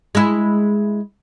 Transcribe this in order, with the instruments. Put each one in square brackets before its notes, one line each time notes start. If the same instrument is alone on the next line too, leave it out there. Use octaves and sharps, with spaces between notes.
[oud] G#3 E4